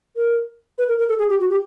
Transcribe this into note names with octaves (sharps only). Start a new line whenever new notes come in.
A#4
B4
A#4
A#4
A4
G#4
G4
F#4
G4